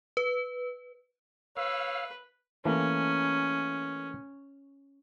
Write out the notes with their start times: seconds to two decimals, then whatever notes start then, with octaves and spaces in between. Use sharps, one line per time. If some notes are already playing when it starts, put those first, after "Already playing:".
0.17 B4
1.57 B4 C#5 F5 E6
2.65 E3 A3 A#3 C#4